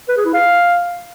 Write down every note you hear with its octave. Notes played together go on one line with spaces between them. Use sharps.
B4
G#4
E4
F5